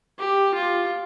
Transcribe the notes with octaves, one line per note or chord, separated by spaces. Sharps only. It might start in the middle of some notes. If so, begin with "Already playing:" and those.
G4
F4